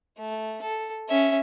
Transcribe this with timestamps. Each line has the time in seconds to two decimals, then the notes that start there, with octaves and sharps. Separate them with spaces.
0.17 A3
0.61 A4
1.08 C#4 E5